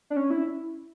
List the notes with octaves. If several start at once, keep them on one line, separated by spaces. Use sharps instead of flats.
D4
C#4
E4